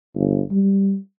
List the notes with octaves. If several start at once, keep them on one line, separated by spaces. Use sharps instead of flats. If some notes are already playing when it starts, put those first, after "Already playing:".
G1
G3